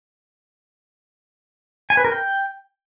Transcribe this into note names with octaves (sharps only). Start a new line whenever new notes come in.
G#5
B4
A#4
G5